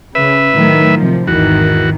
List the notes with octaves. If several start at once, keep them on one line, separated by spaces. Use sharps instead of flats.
C#3 B4 E5
A2 D#3 F#3
C3 F3
G#1 E2 D#3 E3 F#4